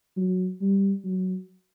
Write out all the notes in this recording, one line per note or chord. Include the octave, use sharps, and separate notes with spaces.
F#3
G3
F#3